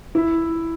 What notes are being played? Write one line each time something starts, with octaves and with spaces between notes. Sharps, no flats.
E4